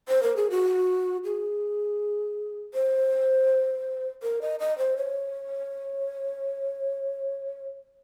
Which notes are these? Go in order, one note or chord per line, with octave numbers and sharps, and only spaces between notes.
C5
A#4
G#4
F#4
G#4
C5
A#4
D#5
D#5
C5
C#5